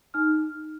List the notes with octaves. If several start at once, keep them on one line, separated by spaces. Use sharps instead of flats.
D#4 F6